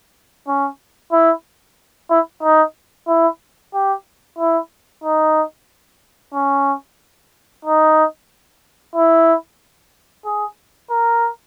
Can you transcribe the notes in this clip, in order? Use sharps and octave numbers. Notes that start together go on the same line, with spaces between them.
C#4
E4
E4
D#4
E4
G4
E4
D#4
C#4
D#4
E4
G#4
A#4